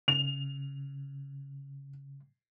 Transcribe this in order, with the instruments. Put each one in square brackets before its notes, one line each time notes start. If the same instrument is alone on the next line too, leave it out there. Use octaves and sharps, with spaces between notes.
[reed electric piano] C#3 [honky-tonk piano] F7